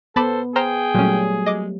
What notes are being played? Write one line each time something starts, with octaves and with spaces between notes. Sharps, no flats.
B3 A4 C5 A5 B5 D6
G#4 C5 G5 A#5 F6
A#2 F#3 G3 A3 C#4
G#3 D#5 D6